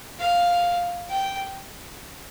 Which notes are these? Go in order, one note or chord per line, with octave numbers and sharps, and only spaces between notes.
F5
G5